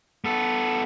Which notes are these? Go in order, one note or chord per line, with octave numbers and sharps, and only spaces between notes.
B3 A4